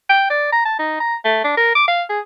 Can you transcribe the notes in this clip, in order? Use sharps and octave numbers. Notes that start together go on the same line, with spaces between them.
G5
D5
A#5
A5
D#4
A#5
A3
D4
A#4
D6
F5
G#4